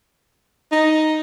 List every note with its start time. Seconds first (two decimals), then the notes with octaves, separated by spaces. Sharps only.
0.72 D#4